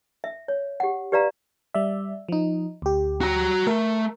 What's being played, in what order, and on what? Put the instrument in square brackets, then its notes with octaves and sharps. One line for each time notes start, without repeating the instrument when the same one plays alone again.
[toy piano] E5
C#5
G4 F#5
G4 B4 D5 F5 A#5
[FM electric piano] G3 D5 E5
F3 D#4
D2 G4
[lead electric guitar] F#4 A#5
[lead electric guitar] A3 [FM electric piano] A#4